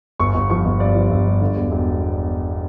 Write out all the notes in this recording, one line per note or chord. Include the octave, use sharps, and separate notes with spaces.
G1 C#6
G1
F3 C#6
G1
G2 D5
F3
G1
G2
D3
E1
E1